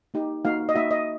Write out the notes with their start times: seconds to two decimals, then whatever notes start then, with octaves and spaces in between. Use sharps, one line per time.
0.14 A#3 D#4 G4
0.45 A#3 D#4 F#4 F5
0.69 D#5
0.75 A#3 D#4 F#4 E5
0.91 D#5